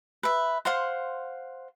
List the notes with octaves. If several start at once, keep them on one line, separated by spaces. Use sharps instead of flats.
B4 E5
C5 F5 F#5 C6